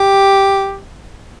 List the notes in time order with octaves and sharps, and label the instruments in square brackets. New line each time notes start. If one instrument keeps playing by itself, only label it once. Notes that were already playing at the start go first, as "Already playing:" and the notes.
Already playing: [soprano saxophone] G4